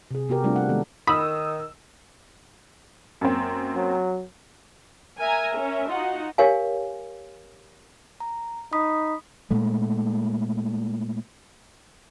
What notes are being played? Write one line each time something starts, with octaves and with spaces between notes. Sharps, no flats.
C3 G#4
C3 B3 F#4 G4 A#4
G3 A3 C4 D4 F4
F#5
D#3 G#3 B3 A4
D#3 B5 D#6 E6
F#2 A#3 C4
F#3
A#4 E5 G#5 A#5
C#4
D#4 F4 F#4 F#5
G4 A#4 C#5 F5 G#5
A#5
D#4 B5 D#6 B6
A#2 G#3 A3